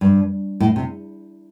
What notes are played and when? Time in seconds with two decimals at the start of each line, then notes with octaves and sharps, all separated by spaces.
0.01 G2
0.60 A2
0.76 C3